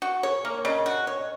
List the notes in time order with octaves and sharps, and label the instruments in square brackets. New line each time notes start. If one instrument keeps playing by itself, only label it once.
[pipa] F#4
[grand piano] G#4 [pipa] C#5
[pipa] A#3 [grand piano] A#4
[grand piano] C#5
[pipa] C#3 [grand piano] D#5
[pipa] F#4
C#5
[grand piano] D#5